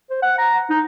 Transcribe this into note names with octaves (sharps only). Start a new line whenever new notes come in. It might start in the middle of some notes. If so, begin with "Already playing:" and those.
C5
F#5
A#5
D#4